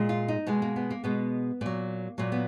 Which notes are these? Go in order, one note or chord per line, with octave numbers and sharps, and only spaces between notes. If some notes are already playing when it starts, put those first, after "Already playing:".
Already playing: A#2 G#3
F4
D#4
B2 G#3 B3
A#3
B3
A#3
B2 G#3 B3
A#2 F#3 A#3
A#2 F#3 A#3
B3